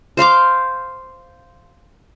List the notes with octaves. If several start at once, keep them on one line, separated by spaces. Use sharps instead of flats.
C5 F5 C6 D6